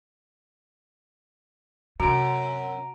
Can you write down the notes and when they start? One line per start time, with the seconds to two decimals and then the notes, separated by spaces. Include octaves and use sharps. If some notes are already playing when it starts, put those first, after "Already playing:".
2.00 F#2 C3 F#4 A#5 D7